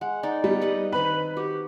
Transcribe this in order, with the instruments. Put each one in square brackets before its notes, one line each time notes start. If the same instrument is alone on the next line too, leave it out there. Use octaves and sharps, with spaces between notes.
[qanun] G#3 [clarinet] F#5
[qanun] D#4 [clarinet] D5
[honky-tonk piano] G3 [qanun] B3
[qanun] B4 D#5 F#5
[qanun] D#3 C4 [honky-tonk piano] B4 [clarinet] B5
[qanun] F#4 [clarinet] G4